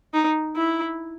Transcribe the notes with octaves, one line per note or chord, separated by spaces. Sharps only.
D#4
E4